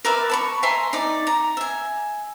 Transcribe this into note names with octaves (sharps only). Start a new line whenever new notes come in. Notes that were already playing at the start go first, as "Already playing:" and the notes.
A#4 B4 D5 E5
A5 B5 C#6
E5 G#5 A#5 C6
D#4 D5
A#5
E5 G#5